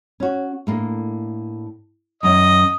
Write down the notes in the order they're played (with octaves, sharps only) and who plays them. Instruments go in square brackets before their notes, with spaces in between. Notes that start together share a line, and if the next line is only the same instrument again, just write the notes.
[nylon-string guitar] C#4 F#4
A2 A#3 D4
[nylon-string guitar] F#2 D#3 C#4 [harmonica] D#5